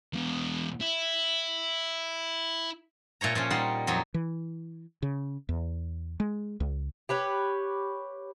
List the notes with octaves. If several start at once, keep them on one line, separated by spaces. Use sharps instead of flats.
E2 B2
E4
A#2 A3 C#5 A#5
A#2 F3 C#4
G3 D#4 F#5 C6
F2 F#3 D#4
E3
C#3
E2
G#3
C#2
G4 B4 C#5